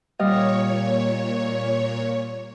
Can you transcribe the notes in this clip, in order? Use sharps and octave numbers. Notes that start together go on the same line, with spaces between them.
A#2 G3 C#5 D#5 F5